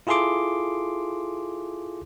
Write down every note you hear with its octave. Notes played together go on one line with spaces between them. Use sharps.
E4 F4 G#4 A4 C6 D6